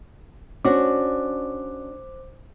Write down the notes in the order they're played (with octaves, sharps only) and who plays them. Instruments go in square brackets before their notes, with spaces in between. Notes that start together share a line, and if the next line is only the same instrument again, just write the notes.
[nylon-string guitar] C#4 D4 F#4 [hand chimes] C5 D6